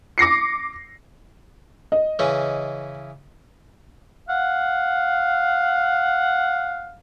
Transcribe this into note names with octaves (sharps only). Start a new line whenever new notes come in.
D6 A#6 C7 C#7
D#5
C#3 E3 C#4
F5 F#5